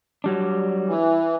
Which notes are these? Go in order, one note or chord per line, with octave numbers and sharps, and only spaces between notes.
F#3 G3 D4
E3